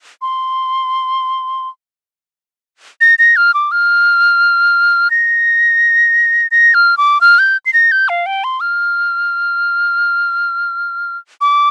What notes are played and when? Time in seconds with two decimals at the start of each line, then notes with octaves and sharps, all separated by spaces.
0.22 C6
3.01 A#6
3.19 A#6
3.36 F6
3.54 D6
3.72 F6
5.11 A#6
6.51 A#6
6.74 F6
6.98 D6
7.21 F6
7.39 G6
7.66 C7
7.73 A#6
7.92 G6
8.09 F5
8.26 G5
8.44 C6
8.60 F6
11.41 D6